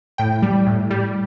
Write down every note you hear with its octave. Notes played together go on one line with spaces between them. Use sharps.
A2 G5
G3
A2
G3